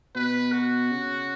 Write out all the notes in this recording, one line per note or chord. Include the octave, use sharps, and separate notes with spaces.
B2 B4
F#4
C#3